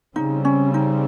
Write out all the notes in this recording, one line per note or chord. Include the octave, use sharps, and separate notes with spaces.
C#3 G3 C4 D#4
C#4
D#4